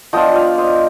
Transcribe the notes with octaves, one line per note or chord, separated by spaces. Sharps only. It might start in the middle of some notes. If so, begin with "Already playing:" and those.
F3 B3 D4 F4 D#5 G5
D5 F5
C5 D#5